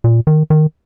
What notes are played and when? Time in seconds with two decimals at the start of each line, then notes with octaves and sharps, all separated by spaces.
0.04 A#2
0.27 D#3
0.50 D#3